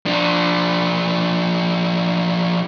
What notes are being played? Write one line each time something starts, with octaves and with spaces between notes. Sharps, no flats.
F3 D4